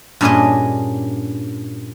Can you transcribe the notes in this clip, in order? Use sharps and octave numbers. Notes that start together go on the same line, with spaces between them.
G2 A#2 C#4 D4 G#4 D#5